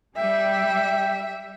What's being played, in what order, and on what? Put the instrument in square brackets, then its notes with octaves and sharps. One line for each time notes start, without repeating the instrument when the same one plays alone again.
[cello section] G3 [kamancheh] E5 [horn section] G5